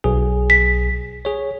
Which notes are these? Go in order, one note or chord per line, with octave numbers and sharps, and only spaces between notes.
B1 G#4
B6
G#4 C#5